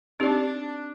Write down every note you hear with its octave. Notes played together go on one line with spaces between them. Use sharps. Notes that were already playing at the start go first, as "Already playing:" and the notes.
C4 D4 D#4 G4 D5